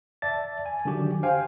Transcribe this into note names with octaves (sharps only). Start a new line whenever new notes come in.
D5 E5 A5 A6
G#5
D3 D#3 F#3 D4 F#4 G4
C5 F5 G5 G#5